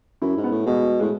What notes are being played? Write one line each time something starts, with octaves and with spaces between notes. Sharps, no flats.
F#2 E4
G#2
B3
A2
B2 G#3
A2 G#3